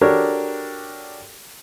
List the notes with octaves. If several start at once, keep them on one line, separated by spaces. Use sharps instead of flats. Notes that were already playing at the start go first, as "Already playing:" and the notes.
D4 F#4 G4 A4 A#4 C#5